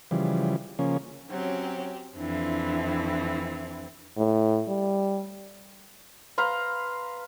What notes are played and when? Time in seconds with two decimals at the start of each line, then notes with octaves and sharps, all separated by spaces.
0.11 C#3 E3 F3 G3
0.79 C#3 F3 A#3 C#4
1.30 F#3 C4 C#4 G4
2.17 F2 E3 C4 D4 E4
4.17 A2
4.68 G3
6.38 B4 F5 A#5 C6